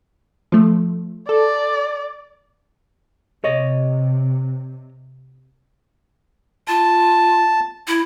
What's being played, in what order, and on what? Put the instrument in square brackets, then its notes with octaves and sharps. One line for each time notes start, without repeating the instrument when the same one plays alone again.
[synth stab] F3 A3
[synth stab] A4 [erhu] D5
[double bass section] C3 [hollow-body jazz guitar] C#5 D#5
[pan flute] F4 [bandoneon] A5
[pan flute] E4